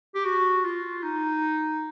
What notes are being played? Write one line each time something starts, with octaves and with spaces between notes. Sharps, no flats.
G4
F#4
F4
D#4